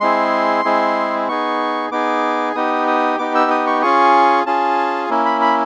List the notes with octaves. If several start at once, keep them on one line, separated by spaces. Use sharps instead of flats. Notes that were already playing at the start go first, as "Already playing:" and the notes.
G#3 C4 E4 G#4 C6
G#3 C4 E4 G#4
B3 D#4 G#4 C#6
B3 D#4 G#4 D6
B3 D#4 G4 D#6
D#6
B3 D#4 G4 D6
E6
D#6
C#6
C#4 F4 G#4 C#6
C#4 F4 G#4 A5
A#3 C#4 E4
B5
B5